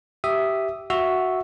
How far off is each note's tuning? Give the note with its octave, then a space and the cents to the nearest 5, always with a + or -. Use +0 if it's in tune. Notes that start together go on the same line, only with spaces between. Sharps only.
G4 -15 E5 +0 D#6 +0
F#4 +0 E5 +0 E6 +0